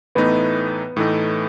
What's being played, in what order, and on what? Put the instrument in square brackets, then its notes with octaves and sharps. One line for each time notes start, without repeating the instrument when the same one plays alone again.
[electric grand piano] A2 E3 A3 D#4 [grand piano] B3
[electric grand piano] A2 E3 A3 D#4